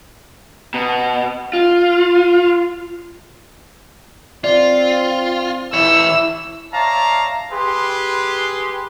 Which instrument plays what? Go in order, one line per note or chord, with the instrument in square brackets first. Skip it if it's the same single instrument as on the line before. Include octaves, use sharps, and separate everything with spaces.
[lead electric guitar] B2
F4
[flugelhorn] C4 [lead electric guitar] F4 [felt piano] D5
[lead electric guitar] E3 C#5 [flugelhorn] E4 [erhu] E6
[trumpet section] C#5 D5 E5 F5 A5 A#5
G4 G#4 B4 C6